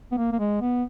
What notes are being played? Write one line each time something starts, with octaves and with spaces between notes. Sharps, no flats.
B3
A#3
A#3
G#3
B3